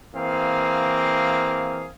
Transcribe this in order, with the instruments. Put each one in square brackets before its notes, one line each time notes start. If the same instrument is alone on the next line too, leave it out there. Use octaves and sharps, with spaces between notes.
[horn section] E3 A#3 C4 G#4 F5